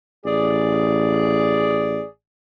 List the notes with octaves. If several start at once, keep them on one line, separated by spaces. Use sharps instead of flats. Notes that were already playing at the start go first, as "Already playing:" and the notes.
A1 G#4 D5